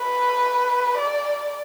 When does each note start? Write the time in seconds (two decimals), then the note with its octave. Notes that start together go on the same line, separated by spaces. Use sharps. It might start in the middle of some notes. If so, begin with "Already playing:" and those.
Already playing: B4
0.97 D5